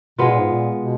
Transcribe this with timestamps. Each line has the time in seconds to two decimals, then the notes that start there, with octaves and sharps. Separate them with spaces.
0.18 B2 G#3 B3 F4
0.30 A#2
0.39 G#2
0.51 A#2
0.77 B2